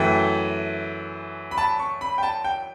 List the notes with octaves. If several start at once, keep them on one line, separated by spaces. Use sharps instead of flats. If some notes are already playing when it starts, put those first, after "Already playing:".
Already playing: F#2 E3 A3 G5
B5
A5
C#6
B5
G5
A5
G5